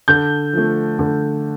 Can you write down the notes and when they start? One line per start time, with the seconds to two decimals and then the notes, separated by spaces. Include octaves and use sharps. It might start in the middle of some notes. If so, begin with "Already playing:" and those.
0.08 D3 G6
0.53 F3 A3
0.99 D3